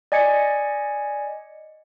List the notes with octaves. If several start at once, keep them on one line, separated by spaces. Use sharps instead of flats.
D5 D#5 G#5 G#6 C#7